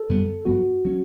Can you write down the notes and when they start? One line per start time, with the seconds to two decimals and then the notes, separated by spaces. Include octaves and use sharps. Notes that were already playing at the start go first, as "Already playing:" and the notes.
Already playing: A4
0.09 F#2 D3 G3 B3
0.45 G2 F#3 B3 F#4
0.85 F#3 C#4